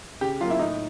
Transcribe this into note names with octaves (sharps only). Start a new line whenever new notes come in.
C#3 G4
F#3 A#3 F4
E4
A2 D#4